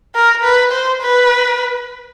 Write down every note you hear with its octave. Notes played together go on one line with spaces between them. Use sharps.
A#4
B4
C5
B4